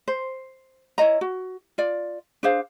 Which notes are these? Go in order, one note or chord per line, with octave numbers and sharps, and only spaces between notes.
C5
E4 C#5 D#5 A#5
F#4
F4 D5
D4 G#4 C5 F5